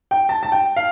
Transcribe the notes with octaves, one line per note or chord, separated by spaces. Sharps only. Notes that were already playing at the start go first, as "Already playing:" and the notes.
G5
A5
A5
G5
F5